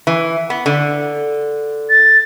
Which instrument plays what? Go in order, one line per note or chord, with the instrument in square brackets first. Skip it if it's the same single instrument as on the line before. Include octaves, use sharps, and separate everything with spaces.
[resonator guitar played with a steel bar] E3
B3
D3
[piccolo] A6